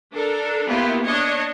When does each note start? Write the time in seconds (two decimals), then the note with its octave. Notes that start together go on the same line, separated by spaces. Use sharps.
0.13 D4 A4 A#4
0.66 A#3 B3 E4 F4 G4
1.04 D4 C#5 D#5